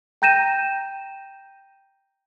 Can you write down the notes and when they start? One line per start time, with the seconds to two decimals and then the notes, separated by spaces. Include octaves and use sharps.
0.22 G5 A#5 G6 A#6 D#7 E7